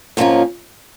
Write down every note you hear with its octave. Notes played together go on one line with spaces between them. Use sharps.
G#2 F3 A#3 C#4 F4